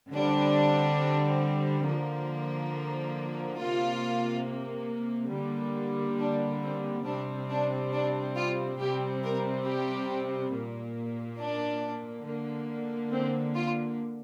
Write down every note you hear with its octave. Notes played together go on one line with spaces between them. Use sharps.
D3 G3 C4 D4
D3 F3 A#3
C3 A#3 F4
D3 G3 A#3
D4
C4
C3 G3 C4 D4
D4
D4
F4
C3 G3 C4 G4
A#4
G4
A#2 A#3
D4
D3 A#3
C4
F4